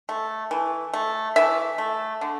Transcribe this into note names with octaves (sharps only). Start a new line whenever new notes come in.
A3
E3
A3
E3 E5
A3
D3